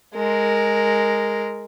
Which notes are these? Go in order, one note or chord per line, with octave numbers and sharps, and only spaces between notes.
G#3 A#4